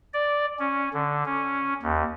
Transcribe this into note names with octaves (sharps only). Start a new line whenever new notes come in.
D5
C#4
D3
C#4
D#2